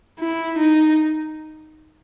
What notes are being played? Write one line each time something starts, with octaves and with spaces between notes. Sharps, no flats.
E4
D#4